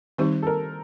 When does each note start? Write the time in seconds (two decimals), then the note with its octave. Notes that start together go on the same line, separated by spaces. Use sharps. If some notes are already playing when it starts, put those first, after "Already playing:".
0.18 D#3 G3 C4 D#4 G4 C5
0.43 A4
0.47 A#4